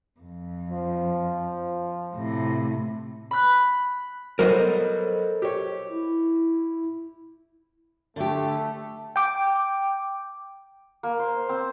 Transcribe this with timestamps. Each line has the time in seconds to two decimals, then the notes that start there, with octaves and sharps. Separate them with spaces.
0.20 F2
0.71 F3
2.16 A2 C3
3.31 B5 F#6
4.39 F#3 G3 B3 A4 A#4 C5 D#5
5.42 G4 C#5
5.90 E4
8.16 D3 A3 G4
9.16 G5 D6
11.03 A#3
11.20 C5
11.49 C4